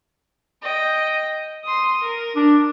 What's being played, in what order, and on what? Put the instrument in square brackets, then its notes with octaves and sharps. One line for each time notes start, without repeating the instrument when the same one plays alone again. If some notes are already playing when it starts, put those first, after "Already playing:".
[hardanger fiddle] D#5 G5
C6 D#6
A#4
[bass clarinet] D4